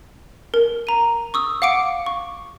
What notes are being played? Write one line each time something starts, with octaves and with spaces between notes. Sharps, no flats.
A#4
A#5 D#7
C#6 D#6 E6
F5 F#5 D6 C#7 D7
C#6